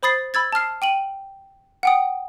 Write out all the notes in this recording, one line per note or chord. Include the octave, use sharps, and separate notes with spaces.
C5 B5 D#6 A6 C7
B5 E6 G#6 A6
A5 D#6 F6 C7
G5 D#7 F#7
F#5 G5 D#6